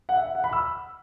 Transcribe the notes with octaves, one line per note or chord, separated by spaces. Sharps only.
F#5
E5
F#5
B5
E6